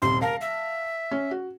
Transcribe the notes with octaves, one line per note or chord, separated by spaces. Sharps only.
D#1 C3 C6
A#4 F5 A5 A#6
E5
C#4
F#4